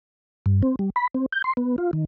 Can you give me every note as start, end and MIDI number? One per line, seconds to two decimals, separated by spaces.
0.46 0.62 43
0.62 0.76 60
0.79 0.90 55
0.96 1.07 83
1.15 1.26 60
1.32 1.42 91
1.44 1.53 84
1.57 1.76 59
1.78 1.91 65
1.93 2.05 51